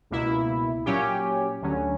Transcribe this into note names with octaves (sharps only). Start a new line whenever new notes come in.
C#2 B2 A#3 E4
A#2 F#3 C#4 G4
D2 D3 F#3 C#4